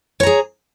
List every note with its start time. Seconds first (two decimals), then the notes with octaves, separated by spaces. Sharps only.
0.20 C#5
0.23 A#5
0.27 G#4